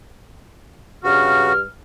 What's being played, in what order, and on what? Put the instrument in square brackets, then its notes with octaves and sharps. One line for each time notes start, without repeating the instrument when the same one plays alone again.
[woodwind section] G2 F6 [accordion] C#3 F#4